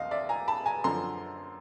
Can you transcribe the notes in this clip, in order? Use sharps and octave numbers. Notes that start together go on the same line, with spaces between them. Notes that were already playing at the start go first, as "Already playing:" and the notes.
Already playing: D#2 D#5 F5 C6
D5 E5
G#5 A#5
A5 B5
G#5 A#5
F#2 D3 F3 A#5 C6